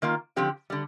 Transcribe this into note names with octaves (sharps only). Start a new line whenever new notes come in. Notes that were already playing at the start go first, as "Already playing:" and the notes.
D#3 A#3 F4
D3 F3 C4 G4
D3 G3